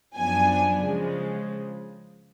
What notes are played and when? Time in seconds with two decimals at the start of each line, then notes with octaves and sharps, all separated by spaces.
0.15 F#2 F3 B3 D4 G#5
0.84 C#3 F3 G#3